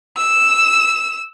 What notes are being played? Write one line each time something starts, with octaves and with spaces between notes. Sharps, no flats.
E6 E7